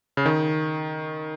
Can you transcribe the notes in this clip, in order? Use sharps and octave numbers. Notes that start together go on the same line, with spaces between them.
C#3
D#3